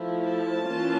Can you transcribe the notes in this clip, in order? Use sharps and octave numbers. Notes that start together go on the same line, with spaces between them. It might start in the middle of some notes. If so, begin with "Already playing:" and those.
Already playing: F3 A3 E4
A5
E3 A#3 C#4 F4